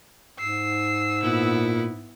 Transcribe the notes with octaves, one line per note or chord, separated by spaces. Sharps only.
G#2 E6 C7
A#2 B3 E4